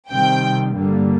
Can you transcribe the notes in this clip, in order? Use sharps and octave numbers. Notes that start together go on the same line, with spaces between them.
C3 D#3 G3 C4 G5
G2 D3 G3 A#3